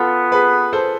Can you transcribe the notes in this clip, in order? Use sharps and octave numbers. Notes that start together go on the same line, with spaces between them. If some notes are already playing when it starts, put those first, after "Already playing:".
Already playing: B3 F4 A4
G#4 B4
A4 C5